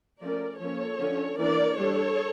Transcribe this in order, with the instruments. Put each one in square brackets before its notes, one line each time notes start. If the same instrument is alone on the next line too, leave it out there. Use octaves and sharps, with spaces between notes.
[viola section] F3 A3 C#4 A#4 D5
F3 A#3 C#4 A4 C#5
D3 F3 C#4
E3 A#3 D4 A#4 D5
G3 D4 A4 C#5